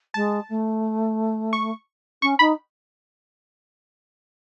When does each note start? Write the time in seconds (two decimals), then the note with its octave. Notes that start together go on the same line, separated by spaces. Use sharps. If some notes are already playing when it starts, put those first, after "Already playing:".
0.14 G#3 A5
0.49 A3
1.53 C#6
2.22 C#4 C#6
2.39 D#4 B5